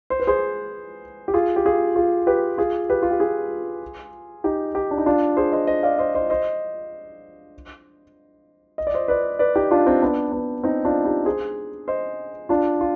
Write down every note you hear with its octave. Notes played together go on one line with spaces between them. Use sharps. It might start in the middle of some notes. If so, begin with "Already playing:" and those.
C5
B4
G#4 C5
G4
F4 G#4
G4
F4 G#4
F4 G#4
G4 B4
F4 G#4
G4 B4
F4
G4
F4 G#4
D#4 G4
D#4 G4
D4
D#4
D4 F4
G#4 C5
C5 D#5
C5 D#5
D5 F5
C5 D#5
C5 D#5
C5 D#5
D#5
D5
C5 D#5
B4 D5
B4 D5
D#4 G4
D4 F4
C4 D#4
B3 D4
B3 D4
C4 D#4
D4 F4
D#4 G4
G#4 C5
C5 D#5
D4 F4
F4